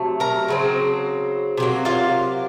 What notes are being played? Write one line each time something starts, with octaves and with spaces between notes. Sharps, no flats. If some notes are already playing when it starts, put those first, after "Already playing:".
Already playing: C3 F#3 A3
A#4 A#5
C#3 F#3 C4
C3 F#3 A#3
F4 F5